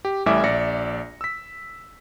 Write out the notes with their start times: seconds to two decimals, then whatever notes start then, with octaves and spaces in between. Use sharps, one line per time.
0.05 G4
0.26 A1 A2 G3 E5 G#5 D6
0.44 A#1 D5 E5 A#6 C#7
1.21 E6 B6